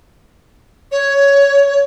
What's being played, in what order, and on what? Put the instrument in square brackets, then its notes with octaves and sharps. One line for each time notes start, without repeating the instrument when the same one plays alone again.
[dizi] C#5